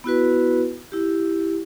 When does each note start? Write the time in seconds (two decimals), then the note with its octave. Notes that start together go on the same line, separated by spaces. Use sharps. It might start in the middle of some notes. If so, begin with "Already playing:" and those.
0.04 B3 E4 F#4 B4
0.92 E4 G4